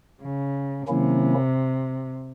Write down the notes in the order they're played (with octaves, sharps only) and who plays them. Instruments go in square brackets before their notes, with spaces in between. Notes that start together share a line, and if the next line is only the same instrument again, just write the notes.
[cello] C#3
[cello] C3 [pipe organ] D#3 F#3 A#3 C#4 E4